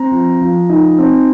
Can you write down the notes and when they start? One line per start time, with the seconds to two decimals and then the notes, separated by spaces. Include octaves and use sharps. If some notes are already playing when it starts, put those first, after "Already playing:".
Already playing: C4 A#5
0.11 F3
0.41 F3
0.69 D#4
0.99 C4